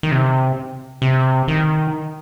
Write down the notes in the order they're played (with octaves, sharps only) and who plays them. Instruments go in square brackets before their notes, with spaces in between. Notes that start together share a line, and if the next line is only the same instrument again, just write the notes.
[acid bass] D#3
C3
C3
D#3